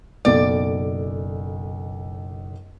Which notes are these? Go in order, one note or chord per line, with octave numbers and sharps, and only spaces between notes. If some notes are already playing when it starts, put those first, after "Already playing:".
F#1 B1 A4 D5